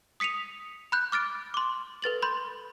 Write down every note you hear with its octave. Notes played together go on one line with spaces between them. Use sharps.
D#6 B6 C#7 D#7 F7
B5 F#6 G6
D6 F6 A6 D7
C6 D6
A4 B4 A6 F#7
B5 C6 G6